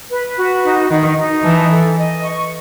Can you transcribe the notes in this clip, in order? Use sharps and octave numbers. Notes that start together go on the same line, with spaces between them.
B4
F#4
D#4
D#3 D#4
D#4
E3 A5
A4
D#5
C#6